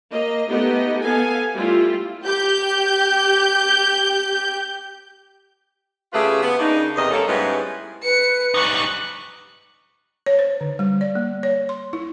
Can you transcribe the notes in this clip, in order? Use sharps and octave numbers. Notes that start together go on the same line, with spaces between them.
A#3 D#5
A3 B3 D#4 G4 D#5
B3 A4 F5 G#5
G3 A3 E4 F4
G4 G6
C#3 A3 F4 G4 G#4 B4
B3
C#3 A#3 D4 D#4
E2 C3 A#4 D#5
G3 A#3 C#4 A4
G#2 G3 G#3 B3 C#4 E4
B4 C#7
G3 D#4 C#6 F#6
C#5
C5
D3
G3
D5
A#3
C#5
C6
E4